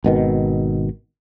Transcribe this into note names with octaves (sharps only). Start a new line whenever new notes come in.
G#1 B2 D#3